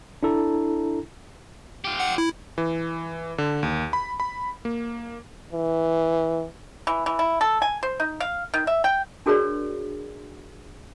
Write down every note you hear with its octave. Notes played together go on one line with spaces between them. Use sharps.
D4 E4 A4 A#5
F4 G4
F#5
E4
E3
D3
D#2
B5
B5
A#3
E3
E3
E3
E4
A4
G#5
C5
D#4
F5
D#3
E5
G5
D4 F#4 G#4 A#4 C#5 D5